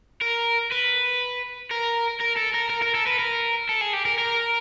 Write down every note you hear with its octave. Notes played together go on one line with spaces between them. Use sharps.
A#4
B4
A#4
A#4
A4
A#4
A#4
A#4
A4
B4
A#4
A4
G#4
G4
A#4
A#4